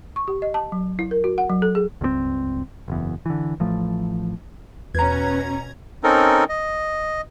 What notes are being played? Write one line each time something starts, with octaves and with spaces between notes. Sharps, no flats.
C#6
G4
D#5
A5
F#3
E4
A#4
F#4
F#5
F#3
A4
G#4
C#2 G2 G#3 C4
F#1 E2
D3 E3
A1 F3 A3
E2 B2 C#4 B4 A#5 G#6
C4 C#4 D#4 A4 A#4
D#5